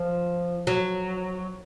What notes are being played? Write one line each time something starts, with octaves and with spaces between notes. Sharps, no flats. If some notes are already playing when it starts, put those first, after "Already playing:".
Already playing: F3
F#3